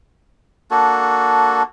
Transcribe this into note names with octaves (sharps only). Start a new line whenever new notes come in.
A#3 D4 F#4 A4